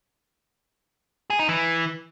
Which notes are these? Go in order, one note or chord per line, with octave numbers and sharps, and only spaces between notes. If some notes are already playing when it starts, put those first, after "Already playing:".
G#4
D#4
E3